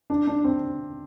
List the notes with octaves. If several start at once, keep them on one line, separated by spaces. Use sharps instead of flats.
D4
D4
C4